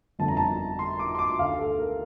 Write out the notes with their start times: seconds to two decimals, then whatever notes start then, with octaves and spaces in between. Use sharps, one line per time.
0.19 G1 F2 D3 A5
0.28 A#5
0.37 A5
0.79 C6
0.99 D6
1.15 C6
1.19 D6
1.39 D2 D3 F5
1.59 A4
1.79 A#4